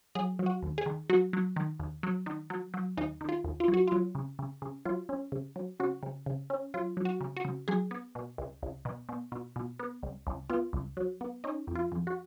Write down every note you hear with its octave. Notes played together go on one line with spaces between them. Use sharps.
F#3 G#4
F#3
F#4
D#2
G#4
D#3
F#3 F#4
F#3
D#3
D#2
F#3
D#3
F#3
F#3
D#2 D#4
D#3
F4
D#2
F4
F#3
F#4
F#3 F4
C#3
C#3
C#3
F#3 F4
C#4
C#3
F#3
C#3 F#4
C#3
C#3
C#4
F#3 F4
F#3
F#4
C#3
F#4
C#3
F#3 G#4
B3
B2
C#2
C#2
B2
B2
B2
B2
B3
C#2
C#2
B3 F4
C#2
F#3
B3
C#4 D#4
F2
F4
F2
F#4